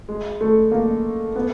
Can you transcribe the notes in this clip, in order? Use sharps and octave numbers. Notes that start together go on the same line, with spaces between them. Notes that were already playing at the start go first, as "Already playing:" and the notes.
G#3
A3
A#3
B3